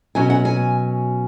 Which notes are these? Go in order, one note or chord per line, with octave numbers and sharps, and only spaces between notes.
B2 F#3 C#4 G#5
F#5
G#5